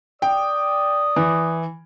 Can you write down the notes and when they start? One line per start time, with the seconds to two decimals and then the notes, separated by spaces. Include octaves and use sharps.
0.22 D5 G5 D#6
1.16 E3